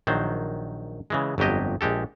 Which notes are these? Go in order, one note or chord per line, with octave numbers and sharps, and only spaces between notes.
A#1 D#3 F#3 C5
C#3 E3 G#3
G1 F2 F#3 G4 D#5
A#1 G#3 G4 A4